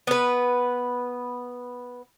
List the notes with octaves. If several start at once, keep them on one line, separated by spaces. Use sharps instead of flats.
B3 B4